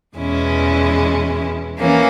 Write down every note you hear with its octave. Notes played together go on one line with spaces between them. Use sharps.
E2 B2 G#3 C#4 E4
E3 A#3 C#4